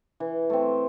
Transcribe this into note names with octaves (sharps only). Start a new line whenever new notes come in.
E3
A3 C4